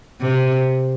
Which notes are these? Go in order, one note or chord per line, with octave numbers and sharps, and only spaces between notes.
C3